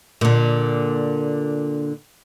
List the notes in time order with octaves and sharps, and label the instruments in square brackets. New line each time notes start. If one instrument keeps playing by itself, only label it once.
[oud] A#2 D3